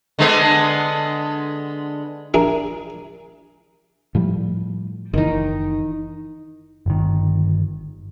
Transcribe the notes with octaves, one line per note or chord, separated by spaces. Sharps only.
D3 G#3 B3
D4 E4 G#4 A#4
A2 F3 G3
F#1 D#3 E3 D#4
G1 D#3